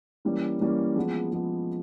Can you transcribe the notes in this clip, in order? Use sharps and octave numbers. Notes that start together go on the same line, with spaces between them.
E3 G3 A#3 C#4
E3 G3 A#3 C#4
F3 G#3 B3
F3 G#3 B3